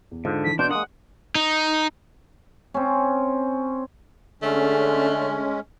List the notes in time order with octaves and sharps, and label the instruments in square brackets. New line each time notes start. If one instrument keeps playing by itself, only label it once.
[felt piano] E2
[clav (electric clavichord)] G#2 [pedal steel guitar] D3 [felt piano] F4
[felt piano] E3 [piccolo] B6
[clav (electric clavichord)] B2 [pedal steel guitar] D4 [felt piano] C6 [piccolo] G6
[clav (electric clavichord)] G#3 A#3 [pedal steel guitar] F#5 [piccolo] D#6
[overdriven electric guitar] D#4
[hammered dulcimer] C4 C#4
[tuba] D3 [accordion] G#3 C#4 [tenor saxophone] A3